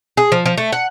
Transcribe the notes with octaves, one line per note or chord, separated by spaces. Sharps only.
G#4
F3
F3
A3
F#5